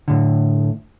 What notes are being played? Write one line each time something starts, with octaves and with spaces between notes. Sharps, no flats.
A2 D3